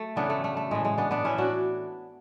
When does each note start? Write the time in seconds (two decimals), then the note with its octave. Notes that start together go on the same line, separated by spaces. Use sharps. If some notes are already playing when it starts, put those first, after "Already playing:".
Already playing: A3
0.16 C#3 E3 B3 D4
0.30 A3
0.44 A3
0.57 A3
0.71 A2 E3 G#3
0.84 G#3
0.98 B3 D4
1.11 B3 D4
1.25 A2 E3 C#4 E4
1.38 D4 F#4